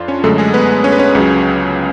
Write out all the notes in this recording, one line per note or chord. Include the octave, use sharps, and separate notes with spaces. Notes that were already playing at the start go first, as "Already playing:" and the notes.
Already playing: F2 D4 F4
C#4 C#5
F#2 D3 G#3 A3 A4
G#3 G#4
B3 B4
C#4 C#5
B4
C#4 C#5
C#2 C#3 F#3